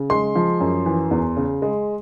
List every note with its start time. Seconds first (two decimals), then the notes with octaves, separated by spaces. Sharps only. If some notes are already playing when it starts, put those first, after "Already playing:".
Already playing: C#3
0.10 G#3 C6
0.36 F3
0.60 F#2
0.86 E3
1.11 E2
1.37 C#3
1.62 G#3